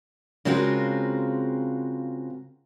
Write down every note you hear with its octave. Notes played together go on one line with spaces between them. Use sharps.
C#3 G#3 C4 F4 F#4 A#4